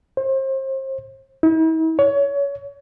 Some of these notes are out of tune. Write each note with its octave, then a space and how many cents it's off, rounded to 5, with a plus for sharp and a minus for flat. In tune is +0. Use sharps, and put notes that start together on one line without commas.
C5 +35
E4 -45
C#5 +25